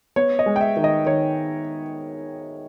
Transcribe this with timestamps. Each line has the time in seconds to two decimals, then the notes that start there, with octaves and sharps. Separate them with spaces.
0.16 B3 C#5
0.39 D#5
0.46 G#3
0.56 G5
0.61 E5
0.77 D#3
0.84 D#5
1.06 D#3 C#5